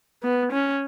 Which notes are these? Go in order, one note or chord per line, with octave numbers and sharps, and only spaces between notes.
B3
C#4